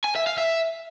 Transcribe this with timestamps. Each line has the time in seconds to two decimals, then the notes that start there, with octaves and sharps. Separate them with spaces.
0.04 G#5
0.15 E5
0.27 F5
0.38 E5